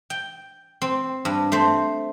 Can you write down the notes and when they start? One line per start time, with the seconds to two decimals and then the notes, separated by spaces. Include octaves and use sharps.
0.10 G5
0.82 C4
1.25 G2
1.52 A3 C4 C5